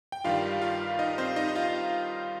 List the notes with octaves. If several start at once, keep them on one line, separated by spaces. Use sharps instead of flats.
G5
G2 D#3 G3 F4 F5
F4 F5
D#4 D#5
C4 C5
D#4 D#5
D#5
F4 F5